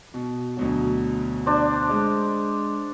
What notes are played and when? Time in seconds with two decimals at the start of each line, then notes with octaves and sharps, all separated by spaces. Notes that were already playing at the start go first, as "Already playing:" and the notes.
0.14 B2
0.57 D2 B2 F#3
1.46 D4 C5
1.89 G#3